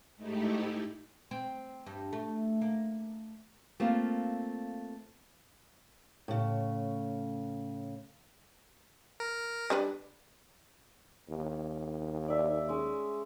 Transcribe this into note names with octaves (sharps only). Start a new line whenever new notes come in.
G#2 A3 D#4 E4 G4
C4
G2
A3
A#3
A3 A#3 C4 F4
A2 C#3
A#4
G3 D4 B4
D#2
D5 E5
G#3 C#4